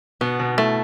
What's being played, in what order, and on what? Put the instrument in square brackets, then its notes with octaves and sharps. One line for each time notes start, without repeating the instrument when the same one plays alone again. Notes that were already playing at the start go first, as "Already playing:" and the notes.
[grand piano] B2 [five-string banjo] B3
[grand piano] B2
[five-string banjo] A3 [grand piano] E4